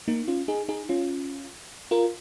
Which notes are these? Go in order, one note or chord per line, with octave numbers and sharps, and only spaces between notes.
A#3 D#4
C#4 F4
D#4 G#4
D#4 G#4
C#4 F4
F4 A#4